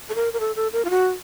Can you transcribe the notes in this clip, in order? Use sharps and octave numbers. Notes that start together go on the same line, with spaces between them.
A4
A#4
A#4
A4
A4
A#4
F4
F#4